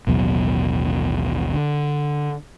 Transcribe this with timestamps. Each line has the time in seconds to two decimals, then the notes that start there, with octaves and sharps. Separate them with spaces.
0.07 A1 D#2 B2 F#3
1.54 D3